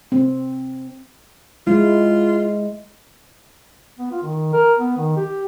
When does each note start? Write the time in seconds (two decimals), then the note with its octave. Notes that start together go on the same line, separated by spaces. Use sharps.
0.12 C4
1.67 G#3 E4 F4
3.98 B3
4.11 F4
4.22 D#3
4.53 A#4
4.79 B3
4.97 D#3
5.17 G4